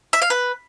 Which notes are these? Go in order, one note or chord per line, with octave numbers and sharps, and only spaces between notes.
E5
F5
B4